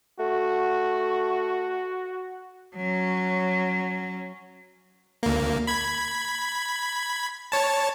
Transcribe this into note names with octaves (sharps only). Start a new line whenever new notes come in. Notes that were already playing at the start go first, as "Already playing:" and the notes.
A3 F#4
F#3 C#4
D2 A#3
B5 G#6
C#5 A5